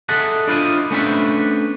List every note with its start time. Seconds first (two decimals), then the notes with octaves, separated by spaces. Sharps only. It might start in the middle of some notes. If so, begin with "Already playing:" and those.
0.09 G#4 A4 D#5 E5 F#5
0.47 D4 E4 F4 C5 D#5
0.91 A3 B3 C#4 D4 C5 E5